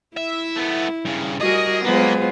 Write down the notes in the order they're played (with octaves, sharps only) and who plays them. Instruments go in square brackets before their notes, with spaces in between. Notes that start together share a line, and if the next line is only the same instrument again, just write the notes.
[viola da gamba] E4 [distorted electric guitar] E5
[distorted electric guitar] A3 B3
G2 C#3
[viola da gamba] G3 F#4 A#4 [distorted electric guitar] G#4 [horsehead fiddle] D#5
[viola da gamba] F#3 F4 C5 [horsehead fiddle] G#3 B3 [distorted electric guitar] A#3